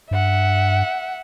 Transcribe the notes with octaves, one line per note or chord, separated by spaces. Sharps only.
G2 E5 F#5